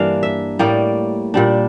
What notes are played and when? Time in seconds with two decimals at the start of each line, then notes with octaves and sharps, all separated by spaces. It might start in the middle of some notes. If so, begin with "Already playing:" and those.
Already playing: G2 E3 A#3 D4 F5
0.23 E5
0.59 A2 G3 A#3 D5
1.34 A#2 G3 D4